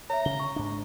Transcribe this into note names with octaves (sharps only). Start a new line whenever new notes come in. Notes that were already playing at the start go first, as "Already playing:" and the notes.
C#5 E5 A#5
C#3 G7
C#6
G#2 D4